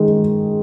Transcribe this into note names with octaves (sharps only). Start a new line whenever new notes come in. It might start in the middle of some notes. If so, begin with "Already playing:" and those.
Already playing: D#3 G#3